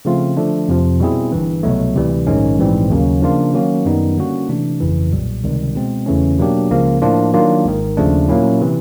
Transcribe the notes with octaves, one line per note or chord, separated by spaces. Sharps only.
C#3 F3 A3 C4 F4
D3 F3 A3 D4
F2 C3 F3
B2 G3 C4 E4 G#4
G1 G2 E3
C2 B2 F#3 A3
D2 C3 E3 G3
A#1 G#2 D#3 G#3 C#4
A#1 G#2 E3 G3 C4
D#2 C#3 F#3 A#3 C#4
C#3 F3 A#3 D4 F4
D#3 F#3 A#3 C#4 F#4
F#2 D#3 G3 B3 D#4
D3 G3 A#3 C#4 F#4
C3 E3 A3 D4
G1 F2 C#3 E3
B1 A#2 G3
C#2 C3 D#3 G3
B2 G#3 C4
E2 C#3 E3 A3 C#4
B2 F#3 A#3 D4 G4
C#2 C#3 F3 A#3
A2 F3 A#3 D4 F4
D#3 F#3 A#3 D4 F4
G#1 G#2 D#3
D#2 C#3 F3 A3 D4
A#2 F#3 A#3 C#4 E4
C3 E3